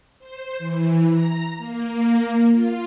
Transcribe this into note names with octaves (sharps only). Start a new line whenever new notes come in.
C5
E3
A#5
A#3
F4